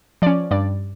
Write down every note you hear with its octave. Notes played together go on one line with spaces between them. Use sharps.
F3 C#4 D5
G2 D5